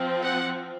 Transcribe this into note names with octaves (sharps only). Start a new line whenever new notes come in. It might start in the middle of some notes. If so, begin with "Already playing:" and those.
Already playing: F3 C4
F#5